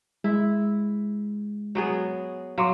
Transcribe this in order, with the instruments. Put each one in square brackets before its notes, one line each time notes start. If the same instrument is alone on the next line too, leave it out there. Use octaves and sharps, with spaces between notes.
[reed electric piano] G#3 [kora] E4
[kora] F#3 B3 G#4
[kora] F#3 [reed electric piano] F5 C6 D6